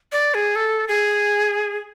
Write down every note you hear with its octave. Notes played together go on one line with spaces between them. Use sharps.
D5
G#4
A4
G#4